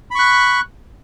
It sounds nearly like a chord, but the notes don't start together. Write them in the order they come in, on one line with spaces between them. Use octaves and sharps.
B5 C#6 F#6